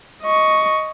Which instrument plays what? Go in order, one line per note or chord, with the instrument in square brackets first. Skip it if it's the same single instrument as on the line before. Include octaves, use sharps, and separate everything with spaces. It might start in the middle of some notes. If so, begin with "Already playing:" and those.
[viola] D#5 C#6